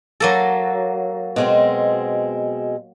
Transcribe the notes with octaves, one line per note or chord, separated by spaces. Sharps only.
F#3 A#3 A4
B2 G#3 C4